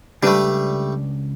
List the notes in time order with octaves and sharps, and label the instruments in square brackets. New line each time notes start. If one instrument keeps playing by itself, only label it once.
[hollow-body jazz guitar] C#2 D4 B4 [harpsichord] G3 A3